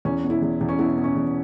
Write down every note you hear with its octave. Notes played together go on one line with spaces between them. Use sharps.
E2 C#4
B2
E4
E2
E2
C#4
B2 E4
B2
C#4
E2